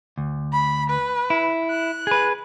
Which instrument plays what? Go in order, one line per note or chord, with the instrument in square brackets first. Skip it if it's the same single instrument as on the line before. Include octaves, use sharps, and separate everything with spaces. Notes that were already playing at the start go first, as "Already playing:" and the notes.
[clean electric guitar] D2
[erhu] B5
B4
[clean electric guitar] E4
[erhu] F#6
[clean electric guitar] G#4 B4